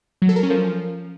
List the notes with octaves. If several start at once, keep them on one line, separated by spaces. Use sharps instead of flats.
F#3
A4
A#4
C#4
F3